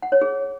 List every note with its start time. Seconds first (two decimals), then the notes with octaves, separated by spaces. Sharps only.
0.02 F#5
0.12 C#5
0.22 G#4